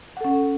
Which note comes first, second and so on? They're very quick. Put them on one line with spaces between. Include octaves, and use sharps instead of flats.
F#5 A4 C#4